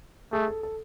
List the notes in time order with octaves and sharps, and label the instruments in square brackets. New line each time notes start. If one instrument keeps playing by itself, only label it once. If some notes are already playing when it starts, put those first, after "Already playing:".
[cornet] A3 [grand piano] G#4
[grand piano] A4
A4